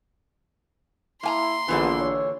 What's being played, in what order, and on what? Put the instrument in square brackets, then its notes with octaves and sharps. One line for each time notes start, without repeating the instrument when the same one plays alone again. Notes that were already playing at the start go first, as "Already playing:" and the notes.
[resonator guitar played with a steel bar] A#3 G#5 A#5 [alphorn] E4 [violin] C6
[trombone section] A#1 [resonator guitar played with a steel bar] A#2 D3 E3 [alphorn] B3
[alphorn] C#5